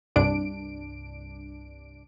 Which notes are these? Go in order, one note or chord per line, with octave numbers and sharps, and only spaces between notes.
C2 G2 D4 D7